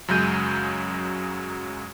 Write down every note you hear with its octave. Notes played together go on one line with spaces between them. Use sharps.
F#2 C#3 F#3 G#3 G6 D#7